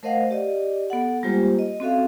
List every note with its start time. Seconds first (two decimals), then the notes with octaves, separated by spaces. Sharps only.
0.03 A3 A#4 C5 D#5 F5 F#5
0.31 G4 D5 D#5
0.90 B3 A4 F#5
1.23 G3 G#3 A#3 F4 G4 C5
1.59 D#5
1.80 C4 C#4 F#4 A4 E5 F5